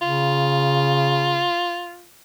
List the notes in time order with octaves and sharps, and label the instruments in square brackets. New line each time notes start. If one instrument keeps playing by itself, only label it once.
[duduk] C#3 [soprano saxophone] F4